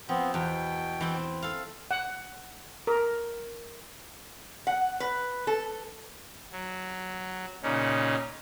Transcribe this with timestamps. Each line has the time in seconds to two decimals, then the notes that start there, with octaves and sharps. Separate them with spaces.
0.09 F3 B3 C4
0.34 E2 B2 G5
1.01 E3 C4
1.42 A4 F5
1.91 F#5
2.87 A#4
4.67 F#5
5.00 B4
5.47 A4
6.51 F#3
7.63 A#2 C#3 C#4 D#4